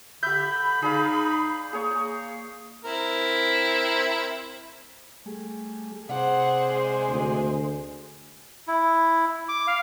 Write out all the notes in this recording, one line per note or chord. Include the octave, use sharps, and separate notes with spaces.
D3 G4 E5 B5 G6
D#4 G#4 D5 F5
A#3 G#4 C#5
C4 E4 A#4
G3 A3 G#4
C3 G#4 C5 D5 F#5
G#3
D2
E4
D6
F5